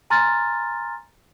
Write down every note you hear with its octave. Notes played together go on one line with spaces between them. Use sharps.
G#5 A#5 C6 F6 A6